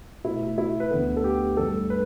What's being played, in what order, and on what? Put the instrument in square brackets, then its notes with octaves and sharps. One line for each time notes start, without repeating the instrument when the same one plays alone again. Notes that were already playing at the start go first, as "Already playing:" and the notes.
[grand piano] B2 A3 E4
E4
B4
D2 D3 B3 A4
A4
G4
G2 D3 A3 A4
B4